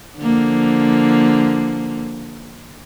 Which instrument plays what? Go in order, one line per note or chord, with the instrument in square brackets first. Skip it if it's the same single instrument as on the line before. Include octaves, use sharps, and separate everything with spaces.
[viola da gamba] D3 F3 A#3